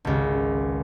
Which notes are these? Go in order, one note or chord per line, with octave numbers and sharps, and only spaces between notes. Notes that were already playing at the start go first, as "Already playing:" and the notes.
G#1 C#2